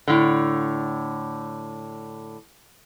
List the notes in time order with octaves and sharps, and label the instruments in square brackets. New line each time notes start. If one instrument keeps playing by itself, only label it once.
[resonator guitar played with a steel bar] A2 D3